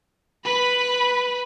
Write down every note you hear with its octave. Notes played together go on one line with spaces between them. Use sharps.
B4 B5